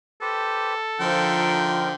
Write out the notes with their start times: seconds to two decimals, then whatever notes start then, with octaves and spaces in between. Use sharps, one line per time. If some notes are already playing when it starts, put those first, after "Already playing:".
0.21 G4 A4 B4 C5
1.01 D3 F3 D#4 F4 A#4 G5